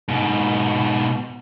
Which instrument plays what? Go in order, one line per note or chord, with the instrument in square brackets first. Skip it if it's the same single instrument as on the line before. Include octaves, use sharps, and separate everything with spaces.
[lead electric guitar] G#2 B2